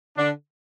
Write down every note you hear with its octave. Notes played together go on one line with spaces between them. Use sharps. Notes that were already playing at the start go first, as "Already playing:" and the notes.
D3 D4